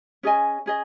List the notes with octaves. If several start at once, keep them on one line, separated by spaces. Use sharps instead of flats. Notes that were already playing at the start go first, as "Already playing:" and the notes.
C#4 G#4 D#5 G#5
C#4 G#4 D#5